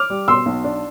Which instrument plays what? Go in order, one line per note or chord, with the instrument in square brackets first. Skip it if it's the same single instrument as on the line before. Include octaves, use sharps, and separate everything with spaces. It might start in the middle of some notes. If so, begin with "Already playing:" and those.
Already playing: [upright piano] D6 F6
G3
B2 C6 E6
B1
D4